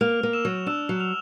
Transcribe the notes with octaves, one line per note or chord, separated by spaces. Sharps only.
A#3 F6 F7
A#3
E6 E7
F#3
D4 E6 E7
F#3
F6 F7